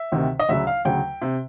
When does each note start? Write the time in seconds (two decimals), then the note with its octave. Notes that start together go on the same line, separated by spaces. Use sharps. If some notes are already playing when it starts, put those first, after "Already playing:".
Already playing: E5
0.12 D2 C3 D#3
0.39 D#5
0.49 D2 C#3 F#3 E5
0.67 F5
0.85 D2 C#3 F#3 G5
1.22 C3